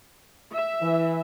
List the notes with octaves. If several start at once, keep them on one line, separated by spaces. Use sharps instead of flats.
E5
E3